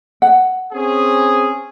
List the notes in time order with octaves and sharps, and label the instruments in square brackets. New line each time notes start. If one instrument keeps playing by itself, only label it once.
[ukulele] F#5
[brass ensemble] C4 C#4 G#4